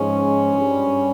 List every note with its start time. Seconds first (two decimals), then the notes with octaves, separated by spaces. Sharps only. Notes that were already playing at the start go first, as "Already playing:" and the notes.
Already playing: G#2 F3 G#3 C#4
0.55 G2 G3